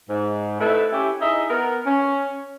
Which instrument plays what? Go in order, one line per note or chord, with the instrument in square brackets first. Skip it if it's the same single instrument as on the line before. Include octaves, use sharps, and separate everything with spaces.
[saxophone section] G#2
A3 C4 D#4 E4 A4 B4
C#4 E4 G4
D#4 E4 G#4 D#5 E5
B3 A#4
C#4